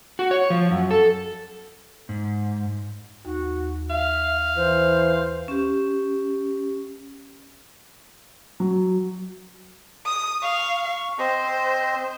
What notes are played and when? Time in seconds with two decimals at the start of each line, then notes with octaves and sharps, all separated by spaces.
0.19 F#4
0.31 C#5
0.50 F3
0.71 F#2
0.91 A4
2.09 G#2
3.25 D#2 D#4 F#4
3.90 E5 F5
4.57 E3 C5
5.48 C#4 G4
8.60 F#3
10.05 D#6
10.42 F5 C#6
11.19 C4 C5 D#5